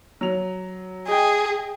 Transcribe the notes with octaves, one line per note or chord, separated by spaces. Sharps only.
F#3 F7
G#4 D#5 G5